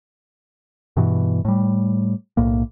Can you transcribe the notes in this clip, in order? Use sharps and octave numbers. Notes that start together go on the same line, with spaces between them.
G2 B2 E3
A2 G3
B1 A2 A#3